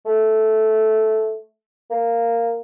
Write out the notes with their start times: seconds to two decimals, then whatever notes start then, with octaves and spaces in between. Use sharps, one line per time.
0.06 A3
1.91 A#3